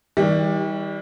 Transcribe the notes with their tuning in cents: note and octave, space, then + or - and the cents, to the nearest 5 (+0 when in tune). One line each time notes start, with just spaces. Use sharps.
D#3 +45 G3 +0